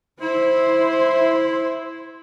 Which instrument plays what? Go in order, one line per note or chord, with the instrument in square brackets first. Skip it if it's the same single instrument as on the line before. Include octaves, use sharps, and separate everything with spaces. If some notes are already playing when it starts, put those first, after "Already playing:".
[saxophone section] E4 [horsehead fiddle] C5